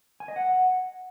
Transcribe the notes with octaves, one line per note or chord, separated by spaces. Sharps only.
G#5
D#5
F#5